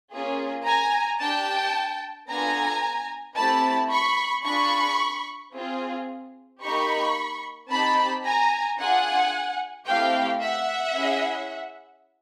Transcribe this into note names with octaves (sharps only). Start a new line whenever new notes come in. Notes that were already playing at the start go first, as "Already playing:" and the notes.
A#3 C#4 F4 G#4
G#5 A#5
D4 G4 G5 A5
B3 D4 F4 A4 G#5 A#5
A3 C4 E4 G4 A5 B5
B5 C#6
D4 F4 G#4 B5 C#6
C4 F4 G#4
A#3 D#4 G4 B5 C#6
C4 D#4 G4 A5 B5
G#5 A#5
D4 F4 G#4 F#5 G#5
A3 C4 E4 G4 F5 G5
E5 F#5
C#4 E4 G#4